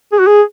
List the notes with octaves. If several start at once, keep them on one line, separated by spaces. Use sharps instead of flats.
G#4
F#4
G#4